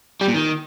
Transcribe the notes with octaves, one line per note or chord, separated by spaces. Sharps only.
G3
A#2
D#3